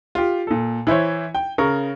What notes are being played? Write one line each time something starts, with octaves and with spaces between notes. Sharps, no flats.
F4 G4
A#2 A4
E3 E4 C5 C#5
G5
C#3 A#4 C#6